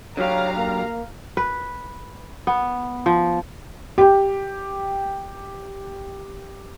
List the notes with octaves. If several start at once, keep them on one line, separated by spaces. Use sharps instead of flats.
D3 F#3 G4 C#5 F5 A#5
A#3
B4
B3
F3
G4 G5